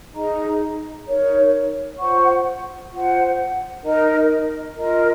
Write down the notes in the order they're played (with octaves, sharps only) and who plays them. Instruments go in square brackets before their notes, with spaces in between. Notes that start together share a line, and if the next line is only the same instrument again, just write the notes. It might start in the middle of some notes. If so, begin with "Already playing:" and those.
[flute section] D#4 G#4 D#5 A#5
D#4 A#4 C#5
F4 C5 F#5 C#6
F4 C5 F#5
D#4 A#4 D#5 A#5
F4 A#4 D#5 A#5